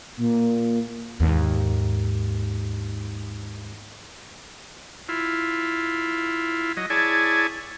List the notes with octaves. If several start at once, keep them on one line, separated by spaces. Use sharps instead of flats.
A#2
D#2 G#2
E4 F4
F#3 D#5
E4 G#4 C#5 D5 G#5 A5